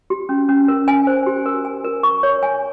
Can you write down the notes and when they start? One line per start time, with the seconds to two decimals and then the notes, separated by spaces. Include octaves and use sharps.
0.10 G4
0.29 C#4
0.49 C#4
0.68 A#4
0.88 G#5
1.07 C5
1.26 G4
1.46 A#4
1.65 G#5
1.85 A#4
2.03 C#6
2.23 C#5
2.43 G#5